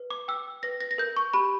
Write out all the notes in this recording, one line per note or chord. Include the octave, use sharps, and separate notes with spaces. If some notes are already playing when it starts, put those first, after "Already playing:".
Already playing: B4
D6
G5 E6
B4 A#6
A#6
A#6
A#4 G6
C#6
G4 B5